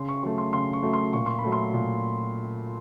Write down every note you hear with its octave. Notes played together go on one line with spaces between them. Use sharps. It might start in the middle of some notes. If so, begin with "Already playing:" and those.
Already playing: C#3 C6
C#6
F#3 A3 C#6
C6
C#3 C6
C#6
F#3 A3
C6
A#2 C#6
C6
B5
F#3 A3
C6
A#2